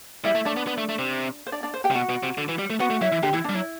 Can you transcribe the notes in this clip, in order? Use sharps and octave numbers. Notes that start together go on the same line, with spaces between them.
G3 E4 E5
A3
A3 D4 D5
B3
B3
A3
A3
C3
C5
D4 D5
D4 D5
C5
G4 G5
C3
B2 F#4 F#5
B2
C3
D3
E3
G3
A3
B3 F#4 F#5
A3
F#3 E4 E5
E3
D3 G4
E3 E4
D4
G3
F#3 E4